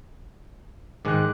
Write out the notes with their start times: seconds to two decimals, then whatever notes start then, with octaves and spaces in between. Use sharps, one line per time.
1.05 G#2 D#3 G#3 D6 F#6